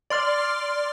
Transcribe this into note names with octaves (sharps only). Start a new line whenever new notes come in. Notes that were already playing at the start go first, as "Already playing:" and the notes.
D5 C6 F6